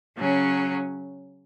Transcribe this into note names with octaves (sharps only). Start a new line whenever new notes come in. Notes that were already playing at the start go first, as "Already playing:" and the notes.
C#3 F#3 C#4